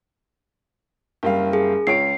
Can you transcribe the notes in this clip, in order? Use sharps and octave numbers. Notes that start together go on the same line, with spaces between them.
F#1 G3 F5
G#4
C#2 C#5 C7 D7